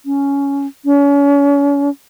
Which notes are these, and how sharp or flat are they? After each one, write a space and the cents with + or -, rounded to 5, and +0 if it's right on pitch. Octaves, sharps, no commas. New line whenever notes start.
C#4 +10
C#4 +35